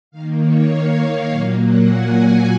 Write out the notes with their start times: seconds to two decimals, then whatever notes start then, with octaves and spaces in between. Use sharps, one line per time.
0.11 D#3 A#3 F5
0.41 C#5
0.70 F5
1.00 F5
1.30 A#2 F#3 A#3 D#5
1.60 F#5
1.89 G#5